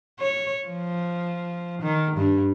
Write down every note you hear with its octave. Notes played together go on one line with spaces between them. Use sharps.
C#5
F3
D#3
G2